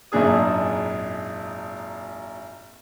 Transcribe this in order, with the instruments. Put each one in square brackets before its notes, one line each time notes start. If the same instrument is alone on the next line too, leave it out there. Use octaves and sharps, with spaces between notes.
[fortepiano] G#1 F#2 A#2 D4 G#4 D#6